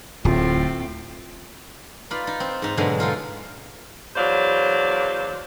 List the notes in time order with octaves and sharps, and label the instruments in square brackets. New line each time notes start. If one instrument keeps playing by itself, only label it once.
[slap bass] D1 [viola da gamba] A2 A3 C4 [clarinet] F4
[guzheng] D#4 F4 B4 D5
D#4
C4
G#2 D#4
G#2 B2 D3 F#3 G#3 A3
G#3 D#4 F4 A4
[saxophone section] E2 F#3 C5 D5 F5